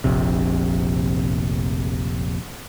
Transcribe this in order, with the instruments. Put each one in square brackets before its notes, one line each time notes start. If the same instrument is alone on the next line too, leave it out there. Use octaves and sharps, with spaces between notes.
[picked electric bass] F1 A#1 C3